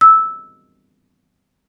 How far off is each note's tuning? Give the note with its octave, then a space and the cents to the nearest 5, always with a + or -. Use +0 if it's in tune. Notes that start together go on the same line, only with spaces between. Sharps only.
E6 -10